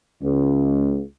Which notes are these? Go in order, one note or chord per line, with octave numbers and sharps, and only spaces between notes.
C#2